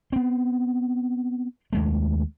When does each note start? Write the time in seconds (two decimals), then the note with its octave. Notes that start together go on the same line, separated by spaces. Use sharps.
0.12 B3 C4
1.73 D#2 G#3 A3